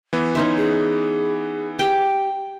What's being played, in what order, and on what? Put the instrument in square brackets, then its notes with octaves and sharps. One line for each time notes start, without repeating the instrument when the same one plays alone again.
[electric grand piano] E3 B3
[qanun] C#4 D#4 E5 [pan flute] C6
[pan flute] G#4
[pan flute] G4 [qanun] G5